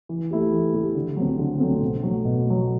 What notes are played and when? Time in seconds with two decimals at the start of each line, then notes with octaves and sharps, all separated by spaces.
0.09 E3
0.31 A3 E4 G4
0.53 E3
0.74 A3 E4 G4
0.95 D3
1.16 F#3 A3 C4
1.39 D3
1.60 F#3 A3 C4
1.81 B2
2.03 F#3 A3
2.25 B2
2.46 F#3 A3